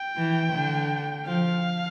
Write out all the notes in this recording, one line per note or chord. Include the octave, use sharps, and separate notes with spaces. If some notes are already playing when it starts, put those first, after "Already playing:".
Already playing: G5
E3
D3
F3 F5